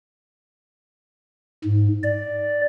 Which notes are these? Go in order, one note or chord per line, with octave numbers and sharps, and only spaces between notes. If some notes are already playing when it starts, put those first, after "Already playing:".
G#2
D5